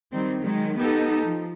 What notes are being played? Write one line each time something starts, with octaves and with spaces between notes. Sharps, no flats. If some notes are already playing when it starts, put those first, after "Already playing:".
D#3 G3 C4
D#3 F#3 G#3
B3 D#4 G4 A4
F3